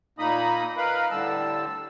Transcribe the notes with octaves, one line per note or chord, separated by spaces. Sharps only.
A#2 A#3 D#4 D#5 B5 D#6
A#4 B4 D#5 F5 B5
A2 D3 G3 A5 E6